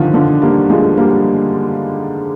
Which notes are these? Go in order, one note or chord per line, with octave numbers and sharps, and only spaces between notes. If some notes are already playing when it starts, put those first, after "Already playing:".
Already playing: D3 D#3 F3
D3 F3
G3 A#3
F3 G#3
G3 A#3